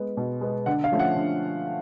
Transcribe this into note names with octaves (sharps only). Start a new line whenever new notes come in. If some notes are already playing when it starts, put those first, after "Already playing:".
Already playing: G#3 B3
B2
G#3 B3
D3 F#5
F5
F3 A3 C#4
F#5
D3